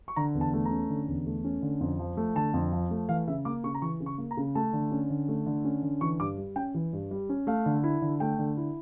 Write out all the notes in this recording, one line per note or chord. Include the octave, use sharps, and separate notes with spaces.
C#6
D3 A#5
E2
A5
A3
A#5
C#4
D3
E2
A3
C#4
D3
F2
F3
A3
D3 A5
F2
F3
A3
E3 F5
C#3 E5
A#3 D6
C#3 C#6
A#5
E3 C#6
C#3
C#6
A#3
A#5
C#3
A3 A5
D3
C#4
D3
A3
D3
C#4
D3
E3 C#6
G2 D6
G3
C#4 G5
E3
G2
G3
C#4
A3 F5
D3
E4
D3
A3 G5
D3
E4